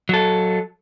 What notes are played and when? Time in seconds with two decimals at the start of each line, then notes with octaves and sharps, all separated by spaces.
0.09 F#3 A4